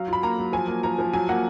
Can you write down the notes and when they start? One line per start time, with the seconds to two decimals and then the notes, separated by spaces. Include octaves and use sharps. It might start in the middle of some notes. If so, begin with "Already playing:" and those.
Already playing: F#3 F5
0.08 F4 B5
0.23 A#3 A#5
0.38 F#3
0.53 F3 G#5
0.68 A#3
0.83 F3 A#5
0.98 F3
1.13 F#3 G#5
1.29 A#3 F#5